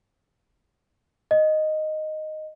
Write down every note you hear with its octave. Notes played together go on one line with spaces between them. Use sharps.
D#5